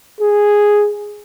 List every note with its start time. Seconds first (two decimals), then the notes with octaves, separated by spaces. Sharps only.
0.20 G#4